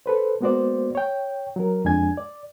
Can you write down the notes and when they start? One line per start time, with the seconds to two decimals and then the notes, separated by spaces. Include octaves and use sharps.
0.06 A4 B4 C5
0.41 G#3 A#3 B3 F#4 C5 D5
0.95 C#5 G5
1.56 F#3 A#4
1.85 F2 G#3 D4 G#5 G#6
2.17 D5